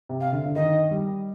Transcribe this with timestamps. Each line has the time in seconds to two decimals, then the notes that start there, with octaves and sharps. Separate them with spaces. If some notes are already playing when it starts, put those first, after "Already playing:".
0.09 C3
0.21 F5
0.33 D3
0.46 D3
0.56 D#3 D#5
0.91 G3